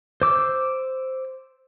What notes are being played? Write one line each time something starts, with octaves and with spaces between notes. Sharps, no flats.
C5 D6 E6